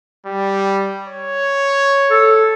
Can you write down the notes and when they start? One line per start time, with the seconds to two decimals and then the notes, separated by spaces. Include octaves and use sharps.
0.26 G3
1.08 C#5
2.10 A4